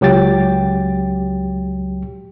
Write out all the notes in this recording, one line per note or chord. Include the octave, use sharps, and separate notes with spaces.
C#2 F#3 G4 G5 A6